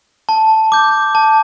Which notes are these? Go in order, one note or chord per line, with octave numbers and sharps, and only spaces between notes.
A5
D6 G6
A5